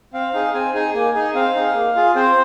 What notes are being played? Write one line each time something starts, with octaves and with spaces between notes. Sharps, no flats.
C4 F5
D#4 G#4
C4 G#5
D#4 G#4 G#5
A#3 G#5
D#4 G#4
C4 F5
D#4 G#4
A#3
F4 G#4
C4 C5